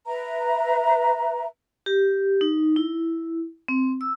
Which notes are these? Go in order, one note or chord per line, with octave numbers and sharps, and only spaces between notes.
B4 E5 A#5
G4
D#4
E4
C4
E6